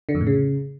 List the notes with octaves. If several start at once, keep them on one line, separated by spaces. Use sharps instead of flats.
D3
F2
A2
C#3